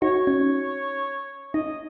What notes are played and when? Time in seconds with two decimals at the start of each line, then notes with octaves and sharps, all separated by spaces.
0.02 D#4 F#4 C#5
0.27 C#4
1.54 D#4 D#5